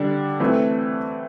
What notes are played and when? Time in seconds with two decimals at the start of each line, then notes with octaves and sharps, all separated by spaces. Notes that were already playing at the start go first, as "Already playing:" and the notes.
Already playing: D3 G3 D4
0.40 E3 A3 C4